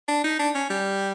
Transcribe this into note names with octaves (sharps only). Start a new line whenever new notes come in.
D4
D#4
D4
C#4
G3